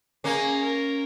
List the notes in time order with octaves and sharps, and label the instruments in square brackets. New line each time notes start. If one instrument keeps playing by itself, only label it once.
[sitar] A#3 C#4 [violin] G#4
[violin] A#4